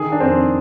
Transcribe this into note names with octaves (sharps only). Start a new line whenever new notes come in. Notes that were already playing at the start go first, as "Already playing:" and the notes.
Already playing: D#3 G#4
D4
F2 C4